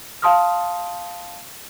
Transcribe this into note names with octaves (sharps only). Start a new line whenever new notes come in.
F5 A5 C6 D#6 F6